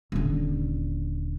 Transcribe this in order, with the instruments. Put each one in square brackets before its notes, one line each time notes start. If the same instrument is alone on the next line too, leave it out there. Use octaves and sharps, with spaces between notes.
[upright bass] D#1 D3